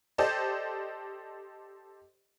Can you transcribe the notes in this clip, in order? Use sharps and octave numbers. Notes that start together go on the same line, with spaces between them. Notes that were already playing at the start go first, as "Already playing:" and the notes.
G4 A4 C5 D5 D#5